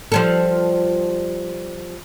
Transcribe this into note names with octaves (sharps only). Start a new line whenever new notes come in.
F3 G3 A4